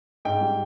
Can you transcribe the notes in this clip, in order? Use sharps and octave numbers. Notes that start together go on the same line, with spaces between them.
G#2 G5
G3